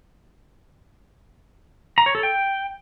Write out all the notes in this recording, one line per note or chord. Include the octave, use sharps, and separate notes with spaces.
A#5
C#5
A4
G5